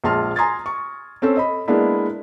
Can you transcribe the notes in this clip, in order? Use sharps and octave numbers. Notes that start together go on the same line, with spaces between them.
A#1 G#3 A5 C6 F6
G#5 A#5 C6 D#6 G#6 A6
C#6
C4 C#4 A4 C5
D#5 B5
G#3 A#3 B3 D4 E4